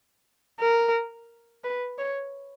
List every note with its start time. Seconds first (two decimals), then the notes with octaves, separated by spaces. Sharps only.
0.60 A#4
1.64 B4
1.98 C#5